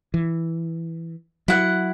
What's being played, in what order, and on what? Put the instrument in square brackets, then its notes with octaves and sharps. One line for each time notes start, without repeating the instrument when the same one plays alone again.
[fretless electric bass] E3
[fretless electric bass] F#3 [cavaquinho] E4 F#5